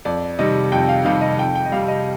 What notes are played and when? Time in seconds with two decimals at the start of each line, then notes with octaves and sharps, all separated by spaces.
0.05 F2 D5
0.39 C3 D#3 G3 D#5
0.72 F2 G5
0.89 F5
1.05 C3 D#3 G3 F5
1.21 D#5
1.38 F2 G5
1.55 G5
1.66 D#5
1.72 C3 G3 F5
1.88 D#5